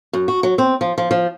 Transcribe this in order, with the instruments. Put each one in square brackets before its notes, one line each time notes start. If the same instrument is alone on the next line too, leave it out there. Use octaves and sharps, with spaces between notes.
[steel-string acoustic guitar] F#2
F#4
F#3
C4
F3
F3
F3